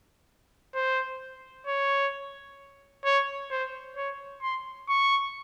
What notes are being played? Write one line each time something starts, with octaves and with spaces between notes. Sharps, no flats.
C5
C#5
C#5
C5
C#5
C6
C#6